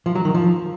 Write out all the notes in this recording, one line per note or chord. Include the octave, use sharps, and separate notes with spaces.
F3
F#3
D#3
F3